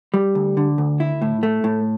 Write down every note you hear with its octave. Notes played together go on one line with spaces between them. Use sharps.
G3
D2
D3
D2
E4
A2
A3
A2